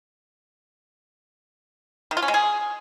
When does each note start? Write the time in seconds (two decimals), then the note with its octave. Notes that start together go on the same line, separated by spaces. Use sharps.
2.11 D#3
2.17 F4
2.22 C#4
2.28 G#3
2.34 G#4